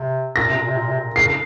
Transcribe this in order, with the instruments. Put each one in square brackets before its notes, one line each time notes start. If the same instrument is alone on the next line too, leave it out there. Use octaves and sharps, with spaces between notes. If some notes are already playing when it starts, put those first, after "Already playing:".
Already playing: [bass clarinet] C3
[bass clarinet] A#2 [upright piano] A#6
[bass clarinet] C3
A#2
C3
A#2
C3
A#2
[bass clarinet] C#3 [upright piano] C7